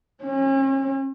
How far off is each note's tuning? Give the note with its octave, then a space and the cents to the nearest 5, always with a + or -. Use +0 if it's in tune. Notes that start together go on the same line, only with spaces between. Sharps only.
C#4 -40